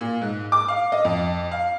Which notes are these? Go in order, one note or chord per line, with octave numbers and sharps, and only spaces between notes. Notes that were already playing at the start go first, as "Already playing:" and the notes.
A#2
G#2
D6
F5
D#5
F2
F5